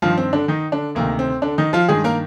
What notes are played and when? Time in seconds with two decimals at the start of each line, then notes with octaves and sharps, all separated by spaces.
0.02 G2 D#3 F3 F4
0.17 C4
0.33 D3 D4
0.48 D#3 D#4
0.72 D3 D4
0.95 D2 C3 D#3 A#3
1.19 C4
1.42 D3 D4
1.58 D#3 D#4
1.73 F3 F4
1.89 G2 D#3 G#3 G#4
2.04 A#3 A#4